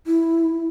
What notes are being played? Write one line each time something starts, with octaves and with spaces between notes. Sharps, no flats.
E4